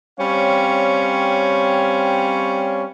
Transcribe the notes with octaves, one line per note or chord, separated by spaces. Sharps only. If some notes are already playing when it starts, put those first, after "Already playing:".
G3 C4 C#4 C#5 F5